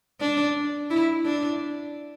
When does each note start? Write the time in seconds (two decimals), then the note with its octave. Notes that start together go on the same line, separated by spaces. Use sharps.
0.20 D4
0.90 E4
1.25 D4